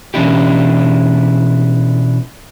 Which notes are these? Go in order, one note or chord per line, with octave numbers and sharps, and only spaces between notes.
B2 E3 C#4 D4 E4 G4